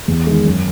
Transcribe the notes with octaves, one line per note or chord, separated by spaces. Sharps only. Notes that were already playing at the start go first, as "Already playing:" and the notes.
E2
D#3 G#3
F#2